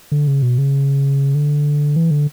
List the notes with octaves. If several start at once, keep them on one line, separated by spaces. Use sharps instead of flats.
D3
C#3
B2
C#3
D3
E3
D3